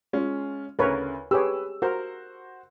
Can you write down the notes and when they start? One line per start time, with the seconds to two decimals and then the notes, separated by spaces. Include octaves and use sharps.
0.13 G#3 C#4 F4
0.79 D2 C#3 A#4 B4 C#5
1.31 G4 G#4 B4 C#5 E6
1.82 F#4 A#4 C5